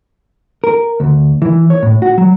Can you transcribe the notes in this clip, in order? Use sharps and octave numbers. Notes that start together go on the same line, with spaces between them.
A#4
D2
E3
C#5
A2
F#4
F#3